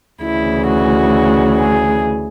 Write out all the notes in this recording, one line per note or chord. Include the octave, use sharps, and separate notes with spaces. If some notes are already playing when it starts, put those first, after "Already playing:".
D2 C#3 E3 E4
F#4
G#4